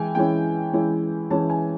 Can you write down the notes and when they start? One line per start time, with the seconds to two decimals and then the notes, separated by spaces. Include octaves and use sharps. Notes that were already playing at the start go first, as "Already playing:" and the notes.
Already playing: E3 G#3 E4 G5 G#5
0.15 E3 G#3 C#4 E4 G5
0.73 E3 G#3 C#4 E4
1.30 E3 G#3 C#4 E4 A5
1.50 G#5